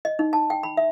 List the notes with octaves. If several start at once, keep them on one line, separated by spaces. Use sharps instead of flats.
D#5
D#4
A5
G5
B5
E5